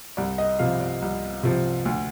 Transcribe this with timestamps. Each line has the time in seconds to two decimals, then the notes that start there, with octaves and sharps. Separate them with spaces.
0.17 C2 D5
0.38 D#5
0.59 C3 F3 F5
0.80 D5
1.02 C2
1.43 C3 F3
1.85 D2